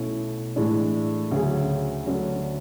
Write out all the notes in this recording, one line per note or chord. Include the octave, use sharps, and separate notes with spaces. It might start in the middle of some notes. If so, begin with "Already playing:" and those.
Already playing: B1 B2 A3 C#4 E4
A2 E3 G#3 D4
D2 C#3 F#3 C#4 G#4
D2 D3 F#3